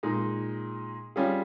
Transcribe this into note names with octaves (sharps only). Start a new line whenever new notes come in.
A#2 G#3 D#4
G3 C#4 F4 G#4